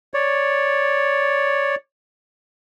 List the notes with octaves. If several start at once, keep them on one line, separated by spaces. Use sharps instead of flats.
C#5 D5